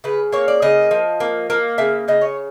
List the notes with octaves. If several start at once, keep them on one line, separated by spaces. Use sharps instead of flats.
C#3 B4
A#3 C#5
D5
C#3 D#5
F3
A#3
A#3
C#3 E5
C#3 D#5
C#5